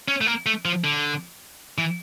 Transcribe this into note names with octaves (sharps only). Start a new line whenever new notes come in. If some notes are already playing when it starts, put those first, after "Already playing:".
C#4
A3
A#3
A3
F3
D3
E3